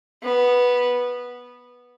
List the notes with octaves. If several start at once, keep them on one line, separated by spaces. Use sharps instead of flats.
B3